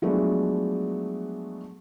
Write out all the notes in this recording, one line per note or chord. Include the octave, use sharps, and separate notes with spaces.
F3 F#3 G#3 A3 B3 D4